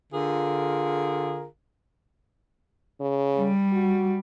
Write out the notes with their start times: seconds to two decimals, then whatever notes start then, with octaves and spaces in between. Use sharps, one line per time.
0.13 D3 F4 G#4 A#4
3.01 C#3
3.37 G3
3.72 F#4